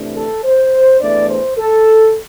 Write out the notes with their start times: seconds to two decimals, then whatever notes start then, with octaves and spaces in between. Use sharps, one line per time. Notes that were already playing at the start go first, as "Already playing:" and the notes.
Already playing: C3 E3 A3 D4
0.16 A4
0.44 C5
1.00 E2 E3 A3 D4 D5
1.29 C5
1.57 A4